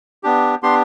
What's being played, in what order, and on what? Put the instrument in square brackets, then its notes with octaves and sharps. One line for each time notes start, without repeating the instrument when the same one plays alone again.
[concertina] B3 D4 G4
B3 D4 G4 C6